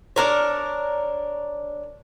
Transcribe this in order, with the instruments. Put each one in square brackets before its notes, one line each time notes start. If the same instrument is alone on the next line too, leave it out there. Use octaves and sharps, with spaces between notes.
[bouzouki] D4 A#4 C#5